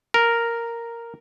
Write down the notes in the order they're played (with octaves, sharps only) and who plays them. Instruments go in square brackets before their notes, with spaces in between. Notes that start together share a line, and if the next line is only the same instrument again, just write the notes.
[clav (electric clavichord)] A#4